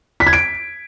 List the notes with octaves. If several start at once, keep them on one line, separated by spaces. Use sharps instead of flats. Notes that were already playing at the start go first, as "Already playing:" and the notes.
B6
G#6
D7